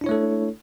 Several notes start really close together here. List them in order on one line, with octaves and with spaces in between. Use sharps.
D4 E4 C#5 A3 A4